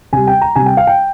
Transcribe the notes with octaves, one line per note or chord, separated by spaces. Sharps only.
C3 G3 G#5
G5
A#5
C3 G3 G#5
G5
F5
G5